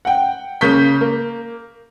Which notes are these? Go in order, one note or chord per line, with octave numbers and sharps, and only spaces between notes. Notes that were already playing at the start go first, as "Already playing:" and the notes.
F#5 G5
C#3 A#3 C#6 G6 B6
A#3